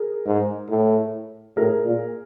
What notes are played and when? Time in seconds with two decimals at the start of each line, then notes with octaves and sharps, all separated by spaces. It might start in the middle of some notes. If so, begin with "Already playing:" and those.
Already playing: G#4 A#4
0.26 G#2
0.70 A2
1.56 A2 G#4 A#4
1.85 A#2